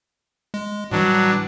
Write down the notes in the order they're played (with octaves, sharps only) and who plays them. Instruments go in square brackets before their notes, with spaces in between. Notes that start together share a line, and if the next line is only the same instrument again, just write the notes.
[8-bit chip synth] G#3
[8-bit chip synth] A2 E3 G3 [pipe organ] F#3 D4